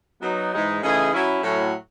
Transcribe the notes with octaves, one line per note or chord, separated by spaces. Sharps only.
F#3 B3 D#4
G#2 E3 G#3 D#4
C#3 E3 A3 D#4 G#4
F#3 C#4 E4
A2 F#3 C#4